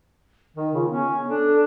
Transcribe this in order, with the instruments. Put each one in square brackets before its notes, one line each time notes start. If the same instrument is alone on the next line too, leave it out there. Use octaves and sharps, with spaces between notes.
[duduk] D#3 [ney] D#4
[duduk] C#3 [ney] F4
[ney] B3 [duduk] C#4
[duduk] D4 [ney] A4